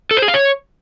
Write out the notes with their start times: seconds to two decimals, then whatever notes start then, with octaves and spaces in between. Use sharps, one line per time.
0.11 A4
0.17 C5
0.22 G#4
0.28 F5
0.34 C#5